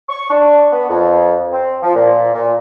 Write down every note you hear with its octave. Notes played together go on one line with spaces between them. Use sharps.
C#6
D4
B3
F2
C4
F3
A#2
A#2